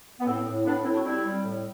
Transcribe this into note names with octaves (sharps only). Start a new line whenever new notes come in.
B3
A2 C4
A2
A2 B3 D4
A2 C4 E4
D4 F#4
G3 C4 E4
G3
A2